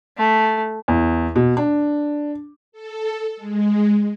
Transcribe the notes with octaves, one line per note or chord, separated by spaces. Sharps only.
A3
E2
B2
D4
A4
G#3